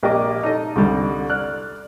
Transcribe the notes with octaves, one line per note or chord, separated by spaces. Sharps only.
A#1 A#3 G4 D5 D#5 D6
D#4 A4 D#5
C2 D3 G3
D5 F6 F#6